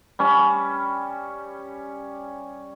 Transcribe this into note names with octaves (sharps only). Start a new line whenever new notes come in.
G3 C#4